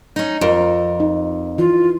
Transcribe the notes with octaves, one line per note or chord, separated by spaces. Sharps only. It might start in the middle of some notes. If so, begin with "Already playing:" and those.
C#4 D#4
F2 F3 A#4
D#4
E3 F4